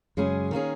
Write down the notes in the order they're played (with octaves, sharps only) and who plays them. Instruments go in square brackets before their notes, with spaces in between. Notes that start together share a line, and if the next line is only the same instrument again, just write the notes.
[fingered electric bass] F#2 [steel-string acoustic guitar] C#3 G#3 C#4 G#4
[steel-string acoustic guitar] D#3 A#3 C#4 G#4